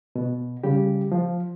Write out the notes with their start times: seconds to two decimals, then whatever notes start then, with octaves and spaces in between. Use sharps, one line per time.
0.16 B2
0.63 C#3 G3 G4
1.12 F3